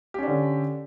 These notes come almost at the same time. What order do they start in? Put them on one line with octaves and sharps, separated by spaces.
G4 C#4 D4 D3